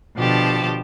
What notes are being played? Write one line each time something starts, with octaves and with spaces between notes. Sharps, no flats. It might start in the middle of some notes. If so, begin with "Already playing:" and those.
B2 D3 F3 G4 A5